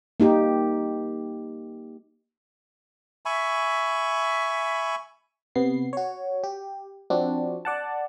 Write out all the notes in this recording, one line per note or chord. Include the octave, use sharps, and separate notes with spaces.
A#3 D#4 G4
E5 G#5 B5 C#6
C3 B3 C7
F#4 C#5
G4
F3 C4 D4 F#4
D5 F#5 A5